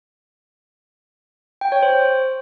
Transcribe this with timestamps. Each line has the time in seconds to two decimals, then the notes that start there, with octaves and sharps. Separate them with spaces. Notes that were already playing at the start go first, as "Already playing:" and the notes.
1.61 G5
1.72 C#5
1.83 C5